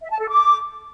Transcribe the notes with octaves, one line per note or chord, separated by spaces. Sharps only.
E5
A5
A4
D6